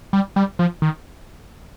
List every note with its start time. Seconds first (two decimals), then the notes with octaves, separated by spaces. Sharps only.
0.13 G3
0.36 G3
0.59 F3
0.82 D#3